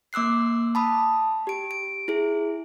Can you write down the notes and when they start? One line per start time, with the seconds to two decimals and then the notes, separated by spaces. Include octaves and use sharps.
0.13 A#3 D6 E6 F#6 C7
0.75 A5 B5 D#6
1.47 G4 D7
1.71 D7
2.08 E4 G#4